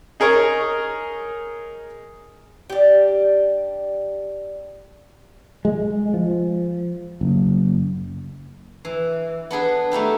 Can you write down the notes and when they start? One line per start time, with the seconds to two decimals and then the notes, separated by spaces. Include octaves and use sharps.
0.20 D#4 G#4 A#4 C#5
2.70 D4 G4
5.65 G#3
6.14 F3
7.21 F#1
8.85 E3
9.51 B3 D4 G#4 B4
9.91 A3 D#4 E4 G4